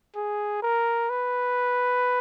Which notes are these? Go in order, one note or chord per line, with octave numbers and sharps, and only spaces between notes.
G#4
A#4
B4